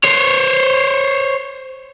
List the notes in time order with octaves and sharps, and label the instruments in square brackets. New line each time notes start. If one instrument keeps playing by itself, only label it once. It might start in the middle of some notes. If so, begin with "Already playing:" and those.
[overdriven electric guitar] C5 C#5